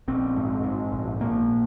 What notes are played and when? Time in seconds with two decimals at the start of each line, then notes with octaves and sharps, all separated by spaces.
0.08 A#1 C4
0.36 G#2
0.64 G#2
0.92 A#1
1.20 A#1 A#3